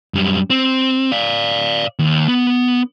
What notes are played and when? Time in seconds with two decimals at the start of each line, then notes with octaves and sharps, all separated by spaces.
0.14 F#2 G3
0.50 C4
1.12 D5 F5
1.99 D#2
2.28 B3